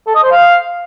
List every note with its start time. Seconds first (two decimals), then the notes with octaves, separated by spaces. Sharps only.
0.07 A4
0.15 D#5
0.23 C5
0.31 F5